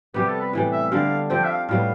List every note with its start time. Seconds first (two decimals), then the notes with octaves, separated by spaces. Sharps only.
0.14 C3 G3 B3 G4
0.28 A4
0.40 B4
0.53 A2 E3 G3
0.72 E5
0.92 D3 G3 D4 F5
1.30 F3 C4 G4 G5
1.44 E5
1.49 F5
1.69 A2 G3 B3 F5